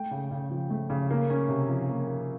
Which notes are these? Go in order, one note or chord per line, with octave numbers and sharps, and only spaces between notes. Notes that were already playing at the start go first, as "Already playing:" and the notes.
Already playing: A3 G5
C#3
C#3
F3
A3
C#3
A#3
C#4
C3
F3
A#3
C#4